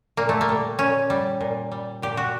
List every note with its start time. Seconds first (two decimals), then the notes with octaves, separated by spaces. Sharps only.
0.17 A#2 A#3
0.29 A3
0.41 A#3
0.49 G3
0.79 A#2 C#4
1.10 G3
1.41 A#2
1.72 G3
2.02 A#2 G4
2.17 F#4